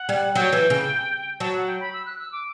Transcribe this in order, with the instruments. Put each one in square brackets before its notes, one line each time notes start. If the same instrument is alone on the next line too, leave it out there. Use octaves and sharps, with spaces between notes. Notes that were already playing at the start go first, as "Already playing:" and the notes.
Already playing: [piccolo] F#5
[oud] G3
[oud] F#3 [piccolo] G5
[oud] E3
C#3
[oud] F#3 [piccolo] A5
[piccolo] F#5
G5
B5
E6
F#6
E6
D6